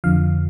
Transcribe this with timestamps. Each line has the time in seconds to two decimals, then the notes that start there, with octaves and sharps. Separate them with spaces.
0.04 F2 D3 F3 F5